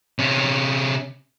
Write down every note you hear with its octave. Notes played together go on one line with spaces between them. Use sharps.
C3 C#4